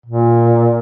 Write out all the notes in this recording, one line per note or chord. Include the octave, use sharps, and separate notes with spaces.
A#2